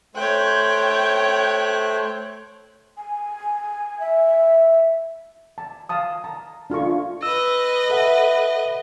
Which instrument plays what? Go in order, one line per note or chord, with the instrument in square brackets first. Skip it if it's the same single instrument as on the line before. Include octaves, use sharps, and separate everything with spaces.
[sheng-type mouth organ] A3 C5 F#6 [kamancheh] C#5 G5
[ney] G#5
E5
[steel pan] A5
F5 A5 D#6
A5 A#5
D4 F4 A4 C#6
[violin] B4 D#5 [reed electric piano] E6
[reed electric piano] A4 E5 F#5